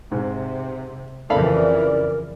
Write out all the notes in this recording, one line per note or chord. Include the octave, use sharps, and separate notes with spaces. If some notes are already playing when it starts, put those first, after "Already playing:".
G#2 C3
F2 C#3 E3 A4 A#4 D5 F5 B5